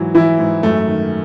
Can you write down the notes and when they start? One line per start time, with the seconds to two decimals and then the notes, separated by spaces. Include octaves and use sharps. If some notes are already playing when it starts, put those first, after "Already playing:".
Already playing: G#2 E3 F#3
0.15 E3 E4
0.39 G#2
0.63 F#2 A3
0.88 D#3